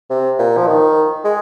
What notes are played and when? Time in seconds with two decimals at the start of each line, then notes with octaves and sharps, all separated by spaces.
0.10 C3
0.39 A#2
0.57 F3
0.67 D#3
1.25 G#3